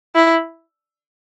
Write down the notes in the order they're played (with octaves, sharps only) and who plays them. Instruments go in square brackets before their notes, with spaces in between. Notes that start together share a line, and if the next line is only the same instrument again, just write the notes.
[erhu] E4